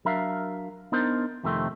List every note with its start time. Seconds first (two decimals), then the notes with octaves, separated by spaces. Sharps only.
0.05 F#3 D4 A#4 E5 F5
0.92 B3 D4 D#4 A#4 C5
1.44 F2 C3 D#3 F3 A3 C4